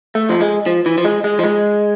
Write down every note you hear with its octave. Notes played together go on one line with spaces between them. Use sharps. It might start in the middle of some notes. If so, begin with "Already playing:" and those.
A3
F3
G#3
F3
E3
F3
G#3
G#3
F3
G#3